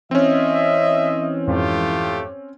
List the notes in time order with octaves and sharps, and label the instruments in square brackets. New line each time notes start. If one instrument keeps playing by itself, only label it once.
[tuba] E3 [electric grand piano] C4 C#4 [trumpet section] D#5 E5
[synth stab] F2 G#2 [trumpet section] A3 F4 G4